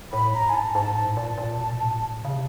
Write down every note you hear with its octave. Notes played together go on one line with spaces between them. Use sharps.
A2 B5
G#2 A#5
G#5
A5
G#2 A5
A2 A5
A#2 A5
A#2
B2
A2
C#3
C3